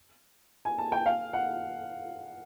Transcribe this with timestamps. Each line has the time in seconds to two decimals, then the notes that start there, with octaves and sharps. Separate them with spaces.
0.65 G#5
0.78 A5
0.92 G5
1.06 F5
1.33 F#5